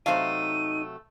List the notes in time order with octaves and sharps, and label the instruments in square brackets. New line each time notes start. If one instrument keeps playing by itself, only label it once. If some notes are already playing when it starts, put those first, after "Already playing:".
[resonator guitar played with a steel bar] C3 F#3 F5 [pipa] A3 C5 [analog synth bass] D#4 [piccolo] D#7